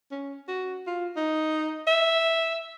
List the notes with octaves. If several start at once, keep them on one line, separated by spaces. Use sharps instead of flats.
C#4
F#4
F4
D#4
E5